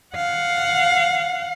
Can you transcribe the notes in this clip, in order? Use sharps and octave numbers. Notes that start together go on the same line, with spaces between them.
F5 F#5